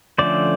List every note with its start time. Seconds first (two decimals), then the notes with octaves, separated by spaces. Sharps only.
0.18 D3 F3 A3 C#4 C5 D5